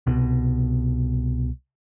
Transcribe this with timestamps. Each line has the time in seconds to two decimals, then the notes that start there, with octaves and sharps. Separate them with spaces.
0.07 C2 B2